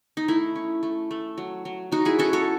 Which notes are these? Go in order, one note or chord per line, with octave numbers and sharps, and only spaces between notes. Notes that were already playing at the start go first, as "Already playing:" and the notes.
D#4
A3 E4
C#4
A3
A3
F#3
F#3
F#3 D#4 F#4
E4 G#4
C#4 F#4 A4
A4 C#5